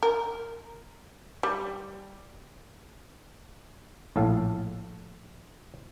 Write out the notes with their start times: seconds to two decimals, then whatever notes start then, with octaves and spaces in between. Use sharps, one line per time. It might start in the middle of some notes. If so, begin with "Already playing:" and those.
0.03 A#4
1.43 G3
4.16 A#1 A2 A4 F5